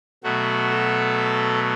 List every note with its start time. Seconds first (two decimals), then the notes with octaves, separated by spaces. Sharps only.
0.24 B2 F#3 A3 F#4
0.70 A4